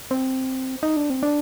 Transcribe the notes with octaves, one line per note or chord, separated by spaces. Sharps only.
C4
D#4
D4
C4
D4